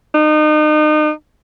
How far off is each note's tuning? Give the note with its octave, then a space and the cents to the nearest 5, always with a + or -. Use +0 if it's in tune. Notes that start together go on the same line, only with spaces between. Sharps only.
D#4 -35